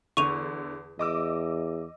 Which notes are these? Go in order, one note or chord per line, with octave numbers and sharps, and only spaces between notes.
E2 D3 C#6 D#7 F7
E2 D#5 D6 E6